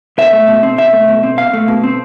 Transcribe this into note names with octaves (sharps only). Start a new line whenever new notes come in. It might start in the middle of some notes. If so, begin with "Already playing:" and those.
B2 E5
A3
B2
C4
B2 E5
A3
B2
C4
B2 F5
A3
B2
C4